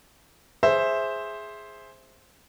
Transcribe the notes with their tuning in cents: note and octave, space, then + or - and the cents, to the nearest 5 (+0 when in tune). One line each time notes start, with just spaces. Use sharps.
G#4 +0 C5 +5 E5 +0